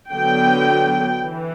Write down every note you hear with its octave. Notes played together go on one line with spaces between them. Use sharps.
D3 F#3 B3 G5
E3